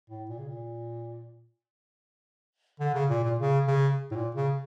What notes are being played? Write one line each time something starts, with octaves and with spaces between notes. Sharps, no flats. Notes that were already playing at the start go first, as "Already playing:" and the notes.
A2
A#2
C#3
A#2
D3
C#3
A#2
A#2
C#3
C#3
A2
A#2
C#3